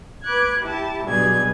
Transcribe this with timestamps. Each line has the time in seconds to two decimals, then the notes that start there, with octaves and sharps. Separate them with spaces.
0.24 B4 D6 F#6 G#6
0.61 E4 G4 A5
1.04 G2 B2 F#3 G#4 G#6